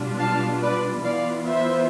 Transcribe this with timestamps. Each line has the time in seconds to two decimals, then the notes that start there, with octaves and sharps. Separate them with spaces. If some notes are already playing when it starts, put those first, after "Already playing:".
Already playing: B2 G3 D4 F4
0.19 F5 A5
0.62 B4 D5
1.04 E3 B3 F4 D5 F5
1.47 C5 E5